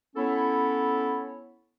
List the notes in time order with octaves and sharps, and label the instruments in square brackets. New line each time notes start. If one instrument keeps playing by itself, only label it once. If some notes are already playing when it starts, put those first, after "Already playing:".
[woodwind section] B3 C#4 E4 A4 C#5